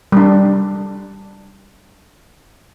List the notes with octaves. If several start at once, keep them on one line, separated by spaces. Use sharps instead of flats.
G3 D4